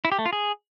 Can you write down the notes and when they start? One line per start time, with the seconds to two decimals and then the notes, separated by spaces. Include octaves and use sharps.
0.05 E4
0.12 G4
0.19 A3
0.26 F4
0.33 G#4